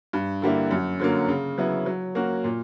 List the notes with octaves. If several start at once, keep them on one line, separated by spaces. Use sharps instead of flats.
G2
D3 G3 A#3 E4
F#2
D3 F#3 A#3
C#3
F#3 B3 E4
F#3
A#3 C#4 F#4
A#2